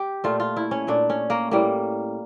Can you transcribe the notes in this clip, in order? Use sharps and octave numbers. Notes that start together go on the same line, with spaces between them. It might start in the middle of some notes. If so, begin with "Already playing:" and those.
Already playing: G4
A#2 A3 F4
F4
E4
C#4
A#2 A3 D4
C#4
A#3
A2 G3 A#3